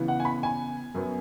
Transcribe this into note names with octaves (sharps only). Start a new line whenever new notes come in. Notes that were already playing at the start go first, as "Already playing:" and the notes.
Already playing: C#3 E3 B3
F#5
G#5
B5
G#5
F#2 F#3 B3